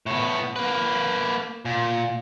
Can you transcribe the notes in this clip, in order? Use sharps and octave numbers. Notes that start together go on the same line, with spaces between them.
A2 B3
A#3 B4
A#2